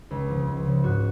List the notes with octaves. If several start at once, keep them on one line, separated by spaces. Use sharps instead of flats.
C#2
C#3 F3
C#2
C#3 F3
G#2 F#4